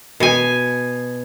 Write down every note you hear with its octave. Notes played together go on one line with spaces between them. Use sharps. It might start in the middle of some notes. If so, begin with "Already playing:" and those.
B2 G#5